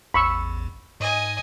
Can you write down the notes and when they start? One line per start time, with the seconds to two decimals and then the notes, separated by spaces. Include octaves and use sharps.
0.14 A1 E2 B5 C#6 E6
1.00 G#2 D#5 G#5